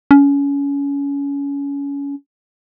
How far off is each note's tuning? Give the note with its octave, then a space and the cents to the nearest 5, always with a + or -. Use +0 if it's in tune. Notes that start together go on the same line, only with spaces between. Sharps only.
C#4 +25